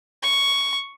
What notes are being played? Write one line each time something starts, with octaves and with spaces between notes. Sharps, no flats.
C#6